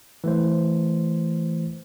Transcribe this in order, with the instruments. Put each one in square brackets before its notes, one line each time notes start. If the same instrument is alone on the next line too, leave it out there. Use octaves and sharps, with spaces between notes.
[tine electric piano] E3 A3 C5